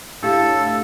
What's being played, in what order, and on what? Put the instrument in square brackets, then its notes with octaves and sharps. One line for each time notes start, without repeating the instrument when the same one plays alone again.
[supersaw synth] A2 [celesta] D4 G4 F5 [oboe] A4